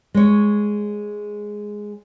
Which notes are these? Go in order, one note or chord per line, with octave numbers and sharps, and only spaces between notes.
G#3 C#5